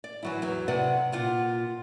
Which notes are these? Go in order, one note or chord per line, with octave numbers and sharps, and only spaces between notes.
D5
E3 F#3 E4
E2 F#3
C3 B4 D5 F#5
A#2 F4 F#5